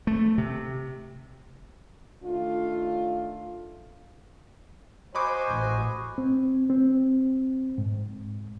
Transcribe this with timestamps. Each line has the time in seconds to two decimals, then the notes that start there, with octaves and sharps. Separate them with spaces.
0.07 A3
0.38 C3
2.23 D#3 A3 D4 F4
5.15 F#4 C5 D#5 G#5 B5 C#6 D6
5.48 A1
6.18 C4
6.70 C4
7.78 G#2